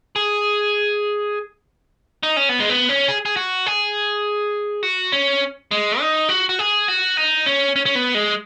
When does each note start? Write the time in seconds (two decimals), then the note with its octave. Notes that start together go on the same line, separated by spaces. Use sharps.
0.16 G#4
2.23 D#4
2.37 C#4
2.49 B3
2.60 G#3
2.70 B3
2.89 C#4
3.08 G#4
3.25 G#4
3.37 F#4
3.66 G#4
4.83 F#4
5.12 C#4
5.71 G#3
6.00 D#4
6.29 F#4
6.49 F#4
6.59 G#4
6.88 F#4
7.17 D#4
7.46 C#4
7.76 C#4
7.86 C#4
7.95 B3
8.15 G#3